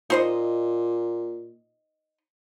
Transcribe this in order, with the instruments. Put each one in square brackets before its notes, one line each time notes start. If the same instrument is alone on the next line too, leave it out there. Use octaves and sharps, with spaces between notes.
[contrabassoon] A#2 [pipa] D#4 C5 D#5